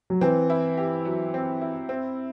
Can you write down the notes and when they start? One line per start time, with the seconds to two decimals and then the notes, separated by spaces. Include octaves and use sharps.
0.10 F#3
0.21 E3 C4
0.50 E4
0.77 G4
1.05 F#3
1.34 C4
1.61 E4
1.89 C4